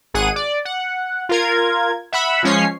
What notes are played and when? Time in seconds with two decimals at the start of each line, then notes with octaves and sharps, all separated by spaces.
0.14 G#1 G#4 F#5 D#7
0.36 D5
0.65 F#5
1.29 F4 A#4 G#6
2.13 E5 F#5 B5 E6
2.43 F3 G#3 C#4 C#5 C7